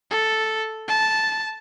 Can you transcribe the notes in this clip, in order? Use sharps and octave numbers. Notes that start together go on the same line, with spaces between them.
A4
A5